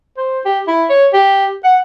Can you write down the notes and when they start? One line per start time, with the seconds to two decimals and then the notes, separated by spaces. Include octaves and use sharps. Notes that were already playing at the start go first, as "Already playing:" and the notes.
0.17 C5
0.45 G4
0.67 E4
0.90 C#5
1.13 G4
1.64 F#5